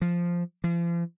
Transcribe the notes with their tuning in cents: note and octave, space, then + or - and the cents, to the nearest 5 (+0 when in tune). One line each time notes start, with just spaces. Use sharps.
F3 -5
F3 -40